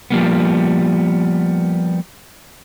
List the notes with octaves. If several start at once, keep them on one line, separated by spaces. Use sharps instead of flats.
F3 G3 A#3 B3